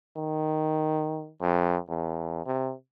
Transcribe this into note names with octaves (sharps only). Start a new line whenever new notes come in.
D#3
F2
E2
C3